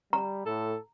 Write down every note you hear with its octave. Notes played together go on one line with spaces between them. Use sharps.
G3 A#5
A2 A4